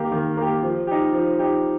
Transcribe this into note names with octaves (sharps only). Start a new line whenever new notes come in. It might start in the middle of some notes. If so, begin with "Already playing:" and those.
Already playing: D#3 A#3 G4
D#3
A#3 G4
F3
D#4 G4
F3
D#4 G4